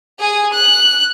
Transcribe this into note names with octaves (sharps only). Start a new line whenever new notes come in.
G#4 G#5
F#6